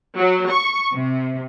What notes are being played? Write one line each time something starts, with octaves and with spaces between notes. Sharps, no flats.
F#3
C#6
C3